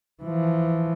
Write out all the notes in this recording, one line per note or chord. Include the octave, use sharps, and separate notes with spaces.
E3 F3